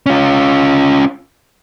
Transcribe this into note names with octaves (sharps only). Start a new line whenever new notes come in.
C#4 F4